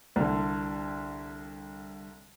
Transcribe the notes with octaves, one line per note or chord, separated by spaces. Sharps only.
C2 D3